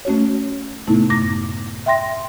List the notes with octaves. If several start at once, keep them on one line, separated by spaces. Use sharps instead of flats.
A3 C#4 F#4 C#5
A2 C3 A3 B3 D#4 E4
F#2 A3 D6 A#6
E5 G5 C6 A#6